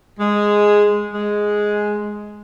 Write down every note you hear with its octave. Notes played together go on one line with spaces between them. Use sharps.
G#3
G#3